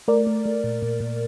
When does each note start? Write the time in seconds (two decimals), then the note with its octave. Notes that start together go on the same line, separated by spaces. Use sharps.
0.08 A3 A#4 D5
0.27 A3
0.45 A3
0.64 A#2
0.82 A#2
1.00 A#2